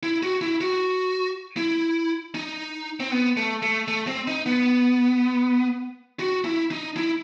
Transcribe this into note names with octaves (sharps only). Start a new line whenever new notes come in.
E4
F#4
E4
F#4
E4
D#4
C4
B3
A3
A3
A3
C4
D#4
B3
F#4
E4
D#4
E4